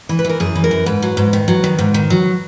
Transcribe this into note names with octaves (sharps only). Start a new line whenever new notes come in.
E3
B4
E3 A#4
F#2 G#4
E3
A#4
F#2
G#2 B4
F#3
G#2
D#3
F#3
D#3
G#2
D#3
F#3